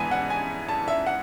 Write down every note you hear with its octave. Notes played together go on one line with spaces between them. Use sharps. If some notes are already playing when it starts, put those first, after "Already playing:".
Already playing: G#2 E3 B3 E4 G#5 A5
F#5
G#5
A5
E5
F#5